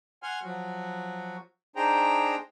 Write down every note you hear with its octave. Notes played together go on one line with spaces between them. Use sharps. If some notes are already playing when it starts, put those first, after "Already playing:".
F#5 G#5 C6 F6
F3 F#3 F#4
D4 D#4 G#4 C5 G5 A#5